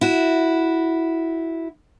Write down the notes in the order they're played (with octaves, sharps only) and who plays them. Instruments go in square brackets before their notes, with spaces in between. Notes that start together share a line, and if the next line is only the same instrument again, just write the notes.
[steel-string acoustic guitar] E4 F#4